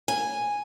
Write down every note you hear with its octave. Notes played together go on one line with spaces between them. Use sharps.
G#5